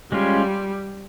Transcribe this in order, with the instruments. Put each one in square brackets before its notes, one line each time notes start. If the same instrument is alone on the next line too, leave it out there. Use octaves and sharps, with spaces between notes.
[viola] G3 [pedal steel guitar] G#3 C#4 F4